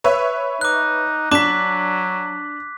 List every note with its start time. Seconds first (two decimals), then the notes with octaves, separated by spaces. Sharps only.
0.04 B4 C#5 E5
0.61 D#4 D6 F#6
1.32 F#3 D4 D6 B6 E7